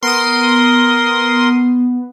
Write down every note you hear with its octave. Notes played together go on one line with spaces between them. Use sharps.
B3 A#4 C6 D#6